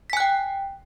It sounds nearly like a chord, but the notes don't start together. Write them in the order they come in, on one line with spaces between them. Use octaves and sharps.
B6 G#5 F#6 G5